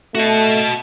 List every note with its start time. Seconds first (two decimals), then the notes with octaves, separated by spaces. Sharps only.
0.15 A3 F#4 D#5